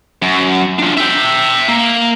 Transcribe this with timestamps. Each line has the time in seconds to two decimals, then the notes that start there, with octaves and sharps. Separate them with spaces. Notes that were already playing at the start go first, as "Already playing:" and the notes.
0.22 F#2
0.79 D4 F4
0.98 E5 G5
1.68 A#3